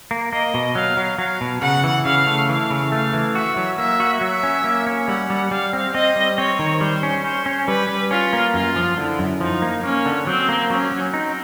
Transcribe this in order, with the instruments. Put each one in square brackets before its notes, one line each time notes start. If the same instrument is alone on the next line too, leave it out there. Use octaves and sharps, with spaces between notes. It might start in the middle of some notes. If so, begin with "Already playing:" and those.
[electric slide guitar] A#3
[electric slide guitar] A#3 [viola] D#5
[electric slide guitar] B2
[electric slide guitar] F#3 [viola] F5
[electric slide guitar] F#3
[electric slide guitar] F#3 [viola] F5
[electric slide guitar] B2
[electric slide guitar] C#3 [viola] F#5
[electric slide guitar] E3
[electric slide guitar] C#3 [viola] F5
[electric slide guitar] A3
[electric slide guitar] E3 [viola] F5
[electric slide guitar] C#3
[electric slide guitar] A3 [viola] F5
[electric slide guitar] E3
[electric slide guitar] F#4 [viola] E5
[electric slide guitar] F#3
[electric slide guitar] A#3 [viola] E5
[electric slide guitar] F#4
[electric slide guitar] F#3 [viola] E5
[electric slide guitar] C#4
A#3
C#4
[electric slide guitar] G3 [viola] F#5
[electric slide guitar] G3
[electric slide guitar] G3 [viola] F5
[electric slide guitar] C4
[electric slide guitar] C4 [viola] D#5
[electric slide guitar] G3
[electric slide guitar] C4 [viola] C#5
[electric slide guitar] D#3
[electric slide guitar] G3 [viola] C5
[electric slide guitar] C#4
[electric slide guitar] C#4 [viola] C5
[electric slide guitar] C#4
[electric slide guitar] G3 [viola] B4
[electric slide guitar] G3
[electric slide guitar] C#4 [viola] F4
[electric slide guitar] A#3
[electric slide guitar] F#2 [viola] F4
[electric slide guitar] F3
[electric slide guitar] D3 [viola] E4
[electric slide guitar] F#2
[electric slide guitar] F3 [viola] D#4
[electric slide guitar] A#3
[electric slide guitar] A#3 [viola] C#4
[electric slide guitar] D3
[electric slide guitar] F#3 [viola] C4
[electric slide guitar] A#3
[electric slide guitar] F#3 [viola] C#4
[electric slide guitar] F#3
[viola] C4 [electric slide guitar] D#4